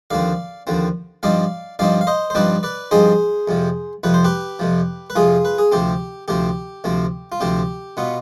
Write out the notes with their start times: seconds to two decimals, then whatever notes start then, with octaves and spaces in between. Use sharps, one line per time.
0.11 D#2 D3 F3 C4 D5 F5
0.67 D#2 D3 F3 C4
1.23 G2 F3 C4 D#4 D5 F5
1.79 G2 F3 C4 D#4 D5 F5
2.01 F5
2.07 C5 D#5
2.30 C5
2.35 G2 F3 C4 D#4 B4 D5
2.63 B4 D5
2.91 G2 F3 C4 D#4 G#4 C5
3.48 F2 C3 F3
4.04 F2 C3 F3 B4
4.14 C5
4.25 G4 B4
4.59 F2 C3 F3
5.10 B4
5.16 F2 C3 F3 F4 G#4
5.45 B4
5.58 G#4
5.72 D2 C3 F3 C4 G4
6.28 D2 C3 F3 C4 G4
6.84 D2 C3 F3 C4
7.32 F4
7.40 D2 C3 F3 C4 G4
7.97 B2 B3 F4